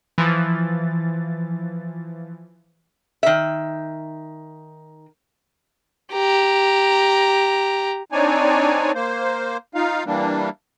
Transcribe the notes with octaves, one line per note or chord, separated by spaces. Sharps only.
E3 F3 A6
D#3 E5
G4 A#5
C4 D4 D#4 C#5 D5 G#5
A#3 C5
D#4 F4 F5
E3 G3 A#3 D4